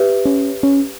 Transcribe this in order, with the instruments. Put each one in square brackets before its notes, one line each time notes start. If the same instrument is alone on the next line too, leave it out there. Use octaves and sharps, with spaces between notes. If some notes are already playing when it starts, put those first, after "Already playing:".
Already playing: [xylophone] G4 B4 E5
[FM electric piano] C#4
C#4